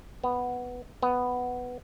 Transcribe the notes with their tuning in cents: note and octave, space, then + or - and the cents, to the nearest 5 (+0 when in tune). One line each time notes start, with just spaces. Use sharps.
B3 +0
B3 +5